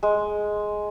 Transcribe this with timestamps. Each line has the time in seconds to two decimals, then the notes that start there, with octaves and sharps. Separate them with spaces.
0.03 G#3